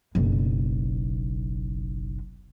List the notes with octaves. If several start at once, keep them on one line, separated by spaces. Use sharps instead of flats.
F#1 B1